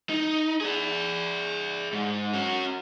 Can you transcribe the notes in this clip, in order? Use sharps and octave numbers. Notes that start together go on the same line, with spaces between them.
D#4
G#4 D5
G#2
C#4 F#4